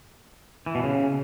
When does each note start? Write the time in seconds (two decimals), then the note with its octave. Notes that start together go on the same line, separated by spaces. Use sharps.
0.66 E3
0.75 B2
0.83 C#3